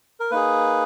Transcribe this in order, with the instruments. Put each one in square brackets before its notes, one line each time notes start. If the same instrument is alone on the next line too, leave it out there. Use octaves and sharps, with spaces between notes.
[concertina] A#4
A#3 D#4 G#4 B4